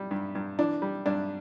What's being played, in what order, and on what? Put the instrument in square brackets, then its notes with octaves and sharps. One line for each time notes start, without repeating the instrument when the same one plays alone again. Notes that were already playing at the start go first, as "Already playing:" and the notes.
Already playing: [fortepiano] G3
G2
G2
E3 D4
G3
G2 D4